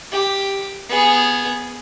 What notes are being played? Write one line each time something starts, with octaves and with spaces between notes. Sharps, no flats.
G4
B3 G#4